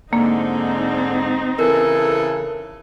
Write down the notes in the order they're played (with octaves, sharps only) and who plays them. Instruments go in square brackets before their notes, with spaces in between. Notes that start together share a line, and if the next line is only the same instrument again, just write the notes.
[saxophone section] G#2 D3 [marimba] A#3 [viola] C4 D#4
[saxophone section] C#3 E3 A4 [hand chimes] A#4